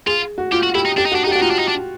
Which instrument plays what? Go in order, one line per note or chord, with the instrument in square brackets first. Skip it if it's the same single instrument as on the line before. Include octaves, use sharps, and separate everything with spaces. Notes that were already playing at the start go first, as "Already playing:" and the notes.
[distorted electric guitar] F4 [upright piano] G#4
[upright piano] F#4
[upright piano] F4 [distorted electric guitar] G4
[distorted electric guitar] F#4
[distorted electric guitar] E4 [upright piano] G4
[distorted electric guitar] D#4
[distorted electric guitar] D4 [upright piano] G4
[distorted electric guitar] D#4
[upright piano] F#4
[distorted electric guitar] D4
[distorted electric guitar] D#4 [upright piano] G4
[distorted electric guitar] D4 [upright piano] F#4
[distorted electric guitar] D#4 [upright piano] F4
[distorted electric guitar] D4
D#4
D4